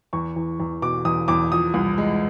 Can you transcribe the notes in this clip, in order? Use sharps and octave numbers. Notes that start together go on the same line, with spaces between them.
E2 C#6
E2
E2
B2 D6
E2 D#6
E2 D6
F3 D#6
C2
G#3